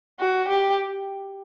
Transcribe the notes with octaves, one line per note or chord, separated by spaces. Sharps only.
F#4
G4